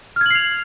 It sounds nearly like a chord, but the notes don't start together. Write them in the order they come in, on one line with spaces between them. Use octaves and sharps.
F6 G#6 F#7 C7 F7